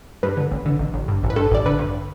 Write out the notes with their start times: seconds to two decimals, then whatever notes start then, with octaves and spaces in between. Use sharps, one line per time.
0.23 G2 B4
0.37 D3
0.51 A1
0.66 D3
0.79 A1
0.94 A1
1.08 G2
1.23 A1
1.30 B4
1.36 G2 A4
1.51 A1 D5
1.66 D3 B4
1.79 G2